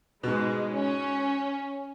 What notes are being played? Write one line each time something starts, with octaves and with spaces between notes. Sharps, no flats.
G#2 B2 G#3
C#4